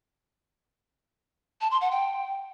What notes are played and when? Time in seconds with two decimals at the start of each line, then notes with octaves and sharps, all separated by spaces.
1.61 A5
1.71 C6
1.81 F#5
1.91 G5